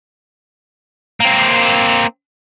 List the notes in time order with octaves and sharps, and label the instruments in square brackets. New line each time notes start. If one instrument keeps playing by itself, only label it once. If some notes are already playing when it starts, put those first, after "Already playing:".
[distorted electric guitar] A#3 C4